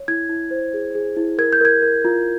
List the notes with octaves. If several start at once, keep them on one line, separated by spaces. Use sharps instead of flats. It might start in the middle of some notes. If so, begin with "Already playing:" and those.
Already playing: C#5
E4 G#6
E4
C5
G#4
G#4
E4
A#4 G#6
G6
A#4 G#6
A#4
F4